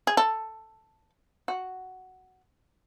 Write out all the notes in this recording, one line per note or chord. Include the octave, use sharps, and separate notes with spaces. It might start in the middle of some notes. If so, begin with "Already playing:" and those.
G#4
A4
F#4